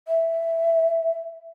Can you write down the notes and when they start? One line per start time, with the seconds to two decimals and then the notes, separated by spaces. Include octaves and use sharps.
0.08 E5